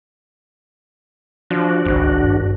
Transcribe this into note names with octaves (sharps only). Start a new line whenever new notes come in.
F3 D4 F#4
G#1 C#2
G2